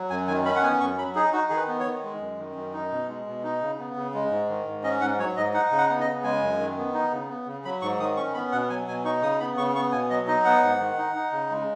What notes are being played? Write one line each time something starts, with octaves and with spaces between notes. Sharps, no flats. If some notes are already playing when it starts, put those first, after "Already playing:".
Already playing: F#3
F#2 G#5
D#3 G#5
C#4 B5
F#5
B3 G#5
F#2 C#6
F#3 B5
D#4 G#4
D#4 F#4
D#3 G#4
B4
B3
C#5
D#3
G#3
F#2
D#3
F#2
D#4
B2
G#3
B2
D#4
C#3
B3
C#3
G#3
G#2
D#3
G#2
C#4 D#5
G#2 F#5
F#3 C#5
G#2 D#5
D#4 F#5
C#3
F#5
B3
D#5
C#3
G#3 G#5
F#2
D#3
B3
D#4
C#3
B3
C#3
F#3 B5
G#2 C#6
D#3 D#6
C#4 C#6
B3 B5
B2 F#5
F#3 G#5
B2 G#5
D#4 C#6
C#3 D#6
B3 B5
C#3 C#6
B3 C#6
B2 G#5
F#3 D#5
D#4 D#5
B3 F#5
G#2
D#3
D#4
D#4
C#3
G#3